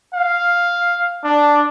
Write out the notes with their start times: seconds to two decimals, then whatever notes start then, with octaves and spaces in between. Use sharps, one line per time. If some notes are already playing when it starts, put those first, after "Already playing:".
0.14 F5
1.24 D4